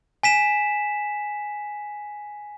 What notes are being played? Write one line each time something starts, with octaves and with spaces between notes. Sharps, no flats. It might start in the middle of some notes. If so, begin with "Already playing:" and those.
G#5 B6 E7